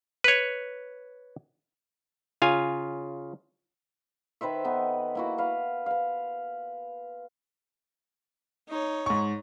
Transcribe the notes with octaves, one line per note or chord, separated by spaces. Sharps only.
B4 C#5
C#3 F4 F5 G#5
D#3 B4 C5 E5
B3 D#4 A4
A#3 E4 F#4
B4 F5
B4 F5
D#4 C#5
G#2 C#6